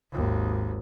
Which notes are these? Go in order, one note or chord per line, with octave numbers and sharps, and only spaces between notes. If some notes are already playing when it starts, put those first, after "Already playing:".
G#1 D#2